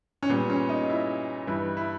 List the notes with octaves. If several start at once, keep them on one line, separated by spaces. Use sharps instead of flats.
C#4
A#2 G3 B3
C#4
D#4
E4
G2 E3 G3 E4
E4